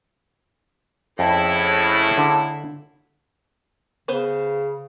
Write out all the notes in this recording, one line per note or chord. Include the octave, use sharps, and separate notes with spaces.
F2 A2 C#3 E4 E5
D3
C#3 B3 B4 C5